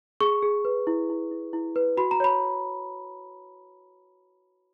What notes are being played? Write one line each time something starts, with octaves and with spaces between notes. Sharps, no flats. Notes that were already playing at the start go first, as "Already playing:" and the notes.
G#4 C#6
G#4
B4
E4
E4
E4
E4
B4
F#4 B5
A#5
C#5 B5